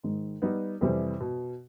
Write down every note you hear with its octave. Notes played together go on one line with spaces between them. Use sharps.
G#2 D#3 G#3
G3 B3 D#4
F2 C3 E3 G3
B2